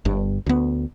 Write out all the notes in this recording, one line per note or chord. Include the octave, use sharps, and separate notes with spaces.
G1 G2
D2 B3